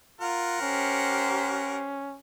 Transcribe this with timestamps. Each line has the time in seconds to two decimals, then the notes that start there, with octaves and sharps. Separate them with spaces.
0.21 F4 A#4 F#5
0.62 C#4 G4 C5